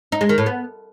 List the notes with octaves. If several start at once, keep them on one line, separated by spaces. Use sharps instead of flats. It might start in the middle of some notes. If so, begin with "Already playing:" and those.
D#4
G#3
D#3
A2
B3